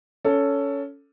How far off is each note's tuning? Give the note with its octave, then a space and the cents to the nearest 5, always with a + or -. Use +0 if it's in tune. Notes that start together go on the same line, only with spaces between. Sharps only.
C#4 +15 A4 +5